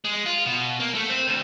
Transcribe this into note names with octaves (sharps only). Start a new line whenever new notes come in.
G#3
F4
B2
A#3
A3
C4
D2